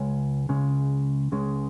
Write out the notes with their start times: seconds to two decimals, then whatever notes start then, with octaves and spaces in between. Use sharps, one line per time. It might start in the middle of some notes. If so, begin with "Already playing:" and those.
Already playing: C#2 G#3 C#5
0.49 C#2 C#3 G#3
1.32 C#2 C#3 G#3